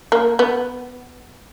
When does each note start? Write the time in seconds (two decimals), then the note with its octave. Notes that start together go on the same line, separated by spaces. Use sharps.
0.12 A#3
0.39 B3